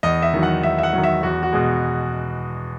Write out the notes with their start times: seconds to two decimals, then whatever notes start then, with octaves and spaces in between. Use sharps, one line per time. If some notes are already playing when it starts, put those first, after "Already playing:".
0.03 E2 D#5
0.22 E5
0.34 D#3 F#3
0.43 F#5
0.63 E2 E5
0.78 E5
0.83 F#5
0.93 D#3 F#3
1.04 E5
1.23 E2 F#4
1.43 F#4
1.53 B2 G#3